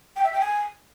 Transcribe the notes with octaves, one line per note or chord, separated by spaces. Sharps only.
G5
E5
G5
G#5